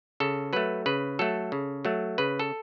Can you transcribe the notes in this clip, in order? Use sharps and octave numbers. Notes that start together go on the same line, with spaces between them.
C#3 A4
F#3 A3 B4
C#3 B4
F#3 A3 A4
C#3
F#3 A3
C#3 B4
A4